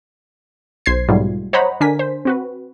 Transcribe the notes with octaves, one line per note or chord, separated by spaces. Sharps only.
B1 C5 G#6 C7
G#2 B2 F#3 G3 A3 F4
C5 C#5 D#5 F#5 A#5 B5
D3 D4 A#4 G#5 B6
C5
C4 F#4 B4